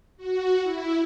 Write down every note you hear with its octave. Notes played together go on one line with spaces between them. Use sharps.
F#4
E4